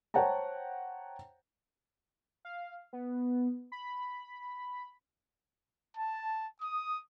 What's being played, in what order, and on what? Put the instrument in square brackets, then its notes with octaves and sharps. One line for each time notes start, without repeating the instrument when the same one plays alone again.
[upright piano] C5 C#5 F#5 G5 A5 A#5
[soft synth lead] F5
B3
B5
[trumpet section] A5
D#6